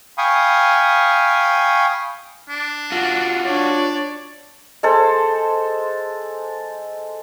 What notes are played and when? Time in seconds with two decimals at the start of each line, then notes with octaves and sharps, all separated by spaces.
0.18 F5 G5 G#5 B5 C#6 D#6
2.49 D4
2.92 F4 F#4
3.45 D4 C#5 D5
4.83 G#3 A4 C5